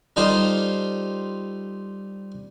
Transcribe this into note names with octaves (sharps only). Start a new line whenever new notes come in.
G3 D#4 F4 A4 C5